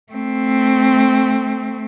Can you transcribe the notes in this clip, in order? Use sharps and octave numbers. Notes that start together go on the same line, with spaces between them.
A3 C4